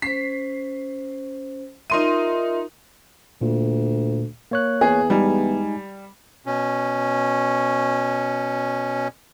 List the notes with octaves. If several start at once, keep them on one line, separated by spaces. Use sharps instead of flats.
C#4 C5 B6 C7
D#4 F4 A#4 E5 C6 D#7
D2 A#2
A#3 C#5 F#6
E2 G#4
G3 G#3 D#4 G#5
B2 C#4